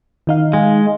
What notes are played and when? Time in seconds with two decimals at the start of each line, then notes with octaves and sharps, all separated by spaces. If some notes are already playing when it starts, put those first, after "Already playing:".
0.27 D#3 D#4 F5
0.53 G#3